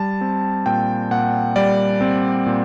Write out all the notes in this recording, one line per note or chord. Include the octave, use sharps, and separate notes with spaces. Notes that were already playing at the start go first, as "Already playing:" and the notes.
Already playing: G3 A5
C4
A#2 G5
A#2 F#5
G3 D5
C4
A#2